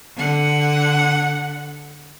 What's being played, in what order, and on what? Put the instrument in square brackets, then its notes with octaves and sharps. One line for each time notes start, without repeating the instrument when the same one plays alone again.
[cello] D3 F#5